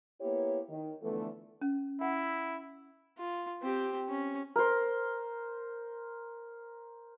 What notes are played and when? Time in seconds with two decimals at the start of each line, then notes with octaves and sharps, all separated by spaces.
0.21 A#3 B3 E4 G4 C#5
0.70 D#3
1.02 D3 E3 F3 A3 B3 A4
1.61 C#4
2.01 E4 F#5
3.18 F4
3.62 C4 G4
4.08 C#4
4.56 A#4 C5